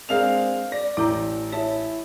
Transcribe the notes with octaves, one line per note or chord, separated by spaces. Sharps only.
G#3 C4 D4 A#4 F5 F7
D5 A#6
A1 E4 A4 A#5
E4 C#5 A5